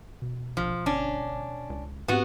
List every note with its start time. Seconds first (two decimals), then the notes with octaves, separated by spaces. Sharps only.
0.22 B2
0.57 A#1 F3
0.86 G1 C#4 D4
1.70 C#2
2.08 G#2 B3 C4 F#4 G4